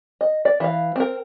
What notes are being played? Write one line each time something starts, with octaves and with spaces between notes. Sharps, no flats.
D#5
D5
E3 F5
C4 A#4